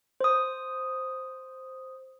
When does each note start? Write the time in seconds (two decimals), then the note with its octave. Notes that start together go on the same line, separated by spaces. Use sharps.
0.21 C5 D#6